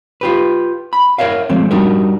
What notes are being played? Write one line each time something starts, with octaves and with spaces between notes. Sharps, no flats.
F4 G4 B4
B5
A#4 C#5 E5 F5
F3 G#3 A3 C4
G3 D4 D#4 F#4 G4 A#4